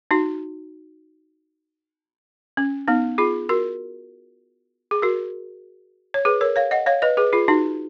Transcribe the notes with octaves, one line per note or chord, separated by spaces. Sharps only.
D#4 F#4
C#4
B3 D#4
F4 G#4
F#4 A#4
G#4
F#4 A#4
C#5
G#4 B4
A#4 C#5
C#5 F5
D#5 F#5
C#5 F5
B4 D#5
G#4 B4
F4 G#4
D#4 F#4